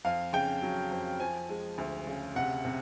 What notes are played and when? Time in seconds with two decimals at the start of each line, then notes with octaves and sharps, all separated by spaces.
0.05 F2 F5
0.33 C#3 G5
0.62 F#3
0.91 F2
1.20 F3 G#5
1.49 G#3
1.78 D2
2.07 C#3
2.35 C3 F#5
2.65 C3